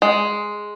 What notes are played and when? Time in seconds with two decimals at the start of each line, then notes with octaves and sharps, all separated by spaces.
0.02 G#3